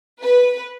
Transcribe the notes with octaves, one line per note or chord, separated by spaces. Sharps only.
B4